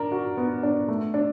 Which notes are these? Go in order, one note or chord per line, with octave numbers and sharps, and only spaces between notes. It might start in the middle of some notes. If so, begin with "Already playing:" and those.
Already playing: D4 A#4
F#4
B3
D4
A3
D4